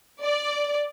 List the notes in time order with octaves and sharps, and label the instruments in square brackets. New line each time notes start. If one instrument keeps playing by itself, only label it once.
[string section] D5